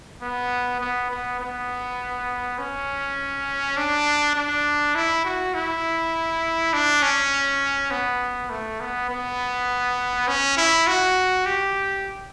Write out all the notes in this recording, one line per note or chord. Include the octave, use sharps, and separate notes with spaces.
B3
B3
B3
B3
C#4
D4
D4
E4
F#4
E4
D4
C#4
B3
A3
B3
B3
C#4
E4
F#4
G4